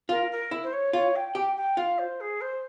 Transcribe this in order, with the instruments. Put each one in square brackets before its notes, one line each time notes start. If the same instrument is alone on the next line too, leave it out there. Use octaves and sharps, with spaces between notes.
[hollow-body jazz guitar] F4 [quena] A#4
[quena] A#4
[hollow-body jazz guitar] E4
[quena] C5
C#5
[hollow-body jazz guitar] F4 [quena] C#5
[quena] G5
[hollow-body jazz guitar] G4 [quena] G5
[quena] G5
[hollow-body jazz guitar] F4 [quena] F5
[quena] C5
G#4
C5